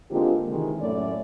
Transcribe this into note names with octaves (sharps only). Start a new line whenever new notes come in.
D3 G#3 A#3 C4 F4 G4
C3 D#3 E3 G#3
F#2 A2 F#3 A3 C#4 D5